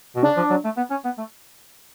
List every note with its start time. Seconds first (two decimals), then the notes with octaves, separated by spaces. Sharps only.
0.15 B2
0.23 C#3 D4
0.37 F3
0.50 F#3
0.64 A3
0.77 B3
0.91 C#4
1.04 B3
1.18 A3